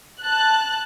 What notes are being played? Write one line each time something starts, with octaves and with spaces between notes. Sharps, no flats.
A5 F#6